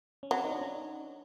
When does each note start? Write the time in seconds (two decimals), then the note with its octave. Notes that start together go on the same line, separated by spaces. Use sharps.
0.23 C#4
0.31 F#3 C4
0.44 D#4
0.52 D4
0.61 C#4